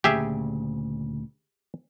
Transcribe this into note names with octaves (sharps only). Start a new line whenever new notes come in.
D2 A#2 C#3 G4 G#4 E5